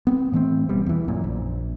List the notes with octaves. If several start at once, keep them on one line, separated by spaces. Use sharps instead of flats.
B3 C4
A2 E3 A3 C4
E1 B2 G3
E2 E3
F#2 A#2
A#1